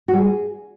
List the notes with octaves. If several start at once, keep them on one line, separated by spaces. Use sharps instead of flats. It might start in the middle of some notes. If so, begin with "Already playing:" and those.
F#4
G3
G#4